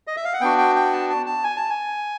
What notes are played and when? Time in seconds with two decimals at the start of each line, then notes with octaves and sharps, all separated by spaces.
0.07 D#5
0.16 E5
0.25 F5
0.33 F#5
0.41 B3 D4 F#4 G5
0.58 G5
0.76 G5
0.93 A5
1.10 A5
1.26 A5
1.44 G#5
1.57 A5
1.70 G#5